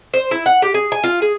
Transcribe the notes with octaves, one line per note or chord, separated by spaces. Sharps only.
C5
E4
F#5
G4
G#4
G#5
F4
G#4